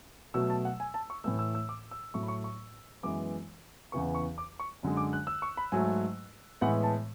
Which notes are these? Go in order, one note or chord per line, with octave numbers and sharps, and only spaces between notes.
B2 F#3 A3 E6
A5
F#5
G#5
A5
C#6
A2 E3 A3 E6
E6
E6
D6
E6
A2 F#3 A3 C#6
B5
C#6
C#6
F#2 E3 G#3 B3 D6
E2 C#3 E3 B3 C#6
C#6
D6
C#6
F#2 D3 G#3
D6
F#6
E6
C#6
B5
G#2 F#3 A3 G#5
A2 E3 G#3 B3 F#5
A5